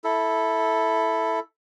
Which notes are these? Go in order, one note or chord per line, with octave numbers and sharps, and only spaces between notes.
E4 A4